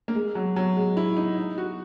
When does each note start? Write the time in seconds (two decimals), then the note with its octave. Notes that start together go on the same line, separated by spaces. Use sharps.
0.08 A#3
0.15 G#3
0.35 F#3
0.56 F#3
0.77 G#3
0.97 E4
1.17 D#4
1.38 D#4
1.58 F#4